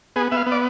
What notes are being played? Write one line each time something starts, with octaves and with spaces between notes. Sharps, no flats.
B3 G#4
B3 E5 F5
B3
D5